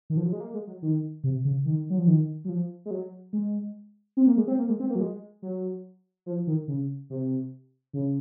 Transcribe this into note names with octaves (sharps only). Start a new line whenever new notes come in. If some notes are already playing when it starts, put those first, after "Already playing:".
D#3
F3
F#3
G#3
A#3
G#3
F#3
D#3
C3
C#3
D#3
F#3
F3
D#3
F#3
F3
G#3
F#3
G#3
C4
A#3
G#3
C4
A#3
G#3
C4
A#3
F#3
G#3
F#3
F3
D#3
C#3
C3
C#3